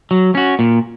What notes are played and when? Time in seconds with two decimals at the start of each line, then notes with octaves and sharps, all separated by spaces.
0.11 F#3
0.35 C#4 F#4
0.59 A#2